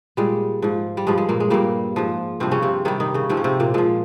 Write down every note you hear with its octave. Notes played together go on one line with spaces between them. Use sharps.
A#2 G3 G#3
G#2 F3
G3
G2 F3 G#3
G#3
A#2 A#3
G#3
G2 A#2 G3 A#3
G#2 F3
G2 C3 F3 C4
C#3 C#4
C3 C4
C3 D#3 G3 D#4
D#3 D#4
C#3 C#4
G#2 C3 F3 C4
C#4
C3 C4
A#2 A#3
A#2 F3 G#3